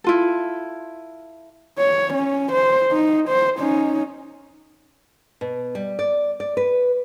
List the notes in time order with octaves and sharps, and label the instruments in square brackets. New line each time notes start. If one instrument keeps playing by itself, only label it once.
[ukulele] E4 F4 A4
[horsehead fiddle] C#5
C#4
C5
D#4
C5
C#4 D#4
[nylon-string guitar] B2
G3
D5
D5
B4